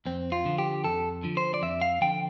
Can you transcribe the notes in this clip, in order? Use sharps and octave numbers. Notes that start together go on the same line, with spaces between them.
F2 C4
F4
D3 F3
G4
F2 A4
D3 F3
C5
D5
F2 E5
F5
D3 F3 G5